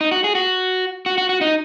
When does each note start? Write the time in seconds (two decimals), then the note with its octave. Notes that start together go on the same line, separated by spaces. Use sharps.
0.01 D#4
0.12 F#4
0.24 G#4
0.35 F#4
1.06 F#4
1.18 F#4
1.29 F#4
1.41 D#4